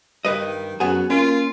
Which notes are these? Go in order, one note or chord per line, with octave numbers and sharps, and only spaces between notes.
G2 D#3 G3 B4 D#5
F#2 F#3 B3 F#4 G#4
A#3 C#4 F4